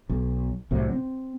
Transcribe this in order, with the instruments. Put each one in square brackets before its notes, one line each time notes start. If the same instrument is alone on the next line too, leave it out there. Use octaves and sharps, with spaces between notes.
[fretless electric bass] B1
C2 A2 C3 F#3
C4